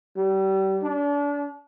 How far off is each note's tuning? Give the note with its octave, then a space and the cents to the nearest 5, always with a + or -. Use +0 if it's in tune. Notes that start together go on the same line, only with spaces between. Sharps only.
G3 -30
D4 -35